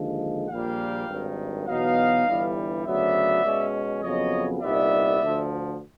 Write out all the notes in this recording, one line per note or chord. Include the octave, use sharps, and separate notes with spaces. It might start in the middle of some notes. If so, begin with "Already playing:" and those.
Already playing: D#2 D3 F3 G#3
A#1 A#2 G3 A#3 F5 G5
G#1 G2 D#3
E2 B2 F#3 B3 D#4 D#5 F5
G1 G2 E3 G3
D2 C#3 F#3 B3 D5 E5
B2 G#3 C#4
F2 C#3 F#3 B3 C#5 D#5
C2 A#2 G3 B3 D#4 D5 E5
D2 D3 F3